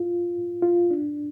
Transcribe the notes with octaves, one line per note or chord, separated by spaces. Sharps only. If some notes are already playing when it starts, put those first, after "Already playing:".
Already playing: F4
F4
D4